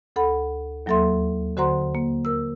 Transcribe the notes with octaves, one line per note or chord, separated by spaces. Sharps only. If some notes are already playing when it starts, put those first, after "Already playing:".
D2 A4 F#5 B5
D#2 F#3 A#3 A4 E5 C6
D3 F#4 C5 F#5 A#5 C6
A#3
A#4 E6